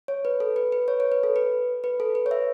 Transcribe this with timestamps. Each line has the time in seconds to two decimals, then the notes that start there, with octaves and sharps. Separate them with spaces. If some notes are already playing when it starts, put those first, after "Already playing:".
0.08 C#5
0.25 B4
0.40 A4
0.56 B4
0.72 B4
0.88 C#5
1.00 C#5
1.12 B4
1.23 A4
1.36 B4
1.84 B4
2.00 A4
2.15 B4
2.26 C#5
2.31 E5